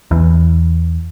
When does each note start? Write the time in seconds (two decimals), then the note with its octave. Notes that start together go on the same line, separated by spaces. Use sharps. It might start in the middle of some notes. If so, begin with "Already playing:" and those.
0.11 E2 E3